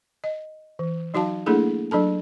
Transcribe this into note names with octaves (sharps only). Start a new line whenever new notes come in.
D#5
E3
F#3 D#4 F#4 F5 A5
A3 A#3 D4 E4 G#4 A4
F#3 D4 A4 A5